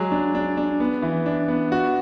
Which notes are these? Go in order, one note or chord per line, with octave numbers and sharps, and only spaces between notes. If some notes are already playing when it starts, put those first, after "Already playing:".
Already playing: F#3 G#3
D4
D4
D4
B3
E3
D4
B3
F#4